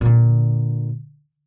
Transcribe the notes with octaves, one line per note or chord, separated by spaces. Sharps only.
A#2 D3